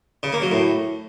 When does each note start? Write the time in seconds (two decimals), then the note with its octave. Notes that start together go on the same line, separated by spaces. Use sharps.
0.23 C#3
0.33 A#3
0.42 F#3
0.52 A2